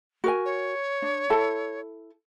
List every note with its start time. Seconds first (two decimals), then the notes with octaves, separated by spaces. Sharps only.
0.24 F#4 A#4 G#5
0.45 C#5
1.02 D4
1.30 E4 A4 A5